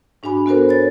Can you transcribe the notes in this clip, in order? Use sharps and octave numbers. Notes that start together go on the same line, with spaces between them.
G#2 D4 F#4 G#5 B5
B3 F#4 A4 A#4 C5
C#5 A6